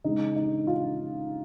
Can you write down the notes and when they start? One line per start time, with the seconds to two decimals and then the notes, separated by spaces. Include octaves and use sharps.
0.04 C#3 G#3 D#4
0.36 D#4
0.67 F4